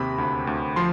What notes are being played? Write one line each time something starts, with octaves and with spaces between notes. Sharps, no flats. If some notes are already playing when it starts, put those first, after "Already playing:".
Already playing: D#2 C3 B5
D2
D2
F3 C6